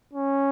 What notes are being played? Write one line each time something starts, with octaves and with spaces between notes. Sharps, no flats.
C#4